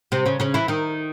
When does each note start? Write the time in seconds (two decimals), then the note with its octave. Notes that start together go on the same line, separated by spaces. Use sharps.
0.12 C3 C4
0.26 C#3 C#4
0.40 C#3 C#4
0.54 E3 E4
0.68 D#3 D#4